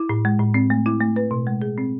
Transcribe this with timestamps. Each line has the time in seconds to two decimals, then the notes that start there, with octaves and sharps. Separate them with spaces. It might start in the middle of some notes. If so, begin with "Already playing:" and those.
Already playing: E4
0.09 A2
0.25 G#3
0.40 A2
0.54 C4
0.70 A3
0.86 E4
1.01 A3
1.16 B4
1.31 B2
1.47 G#3
1.62 G#4
1.78 C4